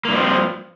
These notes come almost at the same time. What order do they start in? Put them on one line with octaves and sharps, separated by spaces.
A#3 G2 F3 C4